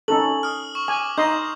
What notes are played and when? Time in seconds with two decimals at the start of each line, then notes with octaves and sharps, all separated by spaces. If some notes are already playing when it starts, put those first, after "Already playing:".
0.08 C#4 D#4 A4 F#7
0.43 D#6 F6
0.75 C#6
0.88 G#5 D6
1.18 D#4 D#5 C6 G6